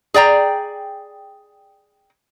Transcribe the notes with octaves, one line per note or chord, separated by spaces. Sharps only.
G#4 D5 G5 A#5